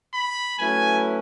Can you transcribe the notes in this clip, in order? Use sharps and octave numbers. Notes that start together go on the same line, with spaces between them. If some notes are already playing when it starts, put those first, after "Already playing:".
B5
F#3 A3 C#4 E4 B4 G#5